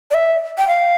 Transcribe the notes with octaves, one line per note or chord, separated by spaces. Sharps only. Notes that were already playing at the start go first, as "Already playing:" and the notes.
D5
E5
G5
F5